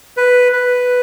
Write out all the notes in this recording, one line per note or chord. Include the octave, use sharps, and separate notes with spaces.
B4
B4